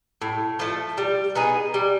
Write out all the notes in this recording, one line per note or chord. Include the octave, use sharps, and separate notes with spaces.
A2
F3 A3
G3
B3 D#4 G#4
G3